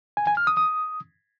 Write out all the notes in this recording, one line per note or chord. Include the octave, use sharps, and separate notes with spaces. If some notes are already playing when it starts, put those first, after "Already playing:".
G#5
G#5
F6
D#6
D#6